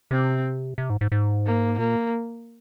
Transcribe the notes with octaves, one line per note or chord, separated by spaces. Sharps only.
C3 C4
C3
G#2
G#2
G#2
A#3
A#2 A#3